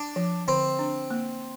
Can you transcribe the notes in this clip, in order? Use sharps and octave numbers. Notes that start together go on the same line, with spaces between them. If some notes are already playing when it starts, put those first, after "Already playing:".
Already playing: D4
F3
D3 C4
D4
A#3